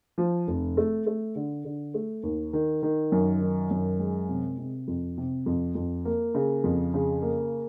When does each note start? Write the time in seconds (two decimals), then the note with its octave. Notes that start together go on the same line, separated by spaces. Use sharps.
0.18 F3
0.48 F1
0.77 A3
1.07 A3
1.36 D3
1.65 D3
1.94 A3
2.23 D#2
2.53 D#3
2.83 D#3
3.12 F#2
3.41 D#3
3.71 F#2
3.99 G#3
4.29 C3
4.58 C3
4.88 F2
5.18 C3
5.46 F2
5.75 F2
6.05 A#3
6.34 C#3
6.64 F2
6.94 C#3
7.22 A#3